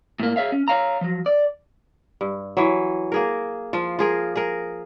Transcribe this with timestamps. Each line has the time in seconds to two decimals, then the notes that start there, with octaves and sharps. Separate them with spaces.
0.20 A2 A#3
0.36 G#4 C#5 E5 F5
0.52 C#4
0.68 C#5 F5 A#5
1.01 F3 F#3
1.26 D5
2.21 G2
2.57 E3 F#3
3.12 A#3 G#4 A#4
3.73 F3 F4
3.99 F4 G#4 A#4
4.36 G#4 A#4